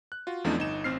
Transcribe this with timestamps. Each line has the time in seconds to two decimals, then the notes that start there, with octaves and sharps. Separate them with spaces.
0.12 F#6
0.27 F4 F#4
0.44 E2 F3 A3 C4 D4 D#4
0.58 G1 D#4 E7
0.84 A1 C4 F6 C7